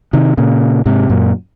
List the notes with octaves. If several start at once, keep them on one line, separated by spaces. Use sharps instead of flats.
C3 D#3
A#2 C#3
G#2 C3
F#2 A#2